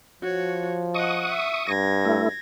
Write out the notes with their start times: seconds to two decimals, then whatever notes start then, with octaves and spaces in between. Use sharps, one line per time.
0.22 F3 F#4 C#5
0.94 D#5 F#5 C#6 D#6
1.28 E5
1.69 G2 G#6 A#6
2.05 A3 E4